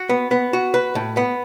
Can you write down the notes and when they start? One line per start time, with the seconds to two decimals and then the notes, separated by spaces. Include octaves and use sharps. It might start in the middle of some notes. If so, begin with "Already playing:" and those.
Already playing: F#4
0.09 B3
0.31 B3
0.53 F#4
0.74 B4
0.95 A2
1.17 B3